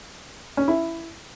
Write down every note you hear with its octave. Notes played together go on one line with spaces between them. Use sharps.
C#4
E4